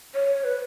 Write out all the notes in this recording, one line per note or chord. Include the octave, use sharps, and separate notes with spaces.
C#5
B4